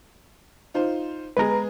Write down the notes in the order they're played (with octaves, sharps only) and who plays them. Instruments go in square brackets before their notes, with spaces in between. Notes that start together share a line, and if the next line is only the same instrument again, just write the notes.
[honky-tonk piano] D#4 F4 C5
[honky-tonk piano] G#3 B3 G#4 [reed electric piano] B4 A#5